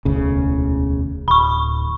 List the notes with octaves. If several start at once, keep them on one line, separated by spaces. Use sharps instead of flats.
E1 D2 C#3
D1 B5 C#6